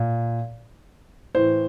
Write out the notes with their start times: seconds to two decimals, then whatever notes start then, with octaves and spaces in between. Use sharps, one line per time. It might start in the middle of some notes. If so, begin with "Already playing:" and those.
Already playing: A#2
1.35 A2 E3 C5